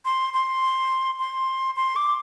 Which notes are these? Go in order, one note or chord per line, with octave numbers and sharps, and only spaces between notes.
C6
C6
C6
C6
D6